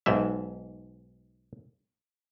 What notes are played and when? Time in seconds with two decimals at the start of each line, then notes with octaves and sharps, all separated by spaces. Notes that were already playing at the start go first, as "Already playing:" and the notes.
0.06 B1 G#2 E5